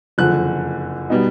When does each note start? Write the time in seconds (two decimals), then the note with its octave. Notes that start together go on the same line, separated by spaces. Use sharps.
0.18 F#1 F2 D3 F3 F#6
1.10 B2 G3 B3 D#4